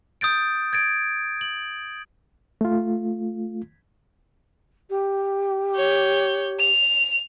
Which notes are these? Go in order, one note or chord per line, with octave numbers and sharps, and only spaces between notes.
D#6 G6 A6 D7
G#6 A6 D7
F#7
A3 F4
G4
C#5 G6
F7